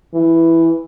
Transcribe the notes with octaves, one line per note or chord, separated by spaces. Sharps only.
E3